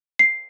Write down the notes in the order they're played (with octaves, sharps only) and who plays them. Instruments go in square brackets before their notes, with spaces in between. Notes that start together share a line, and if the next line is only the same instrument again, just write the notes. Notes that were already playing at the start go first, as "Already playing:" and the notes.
[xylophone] C7